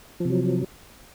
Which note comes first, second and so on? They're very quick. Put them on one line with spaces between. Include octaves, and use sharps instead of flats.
F3 C3 F#3